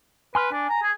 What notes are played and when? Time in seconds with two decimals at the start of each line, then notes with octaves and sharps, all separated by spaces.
0.35 B4 G#5 C6 F6
0.52 D4 G#5
0.70 A#5
0.83 G#4